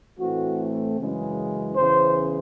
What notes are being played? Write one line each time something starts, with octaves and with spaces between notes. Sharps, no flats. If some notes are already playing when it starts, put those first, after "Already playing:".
A2 E3 A3 C4 F#4
F#2 C#3 E3 G#3
E2 C#3 E3 C5